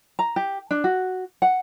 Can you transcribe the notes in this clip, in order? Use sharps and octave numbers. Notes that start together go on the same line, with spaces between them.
A#5
G4
D4
F#4
F#5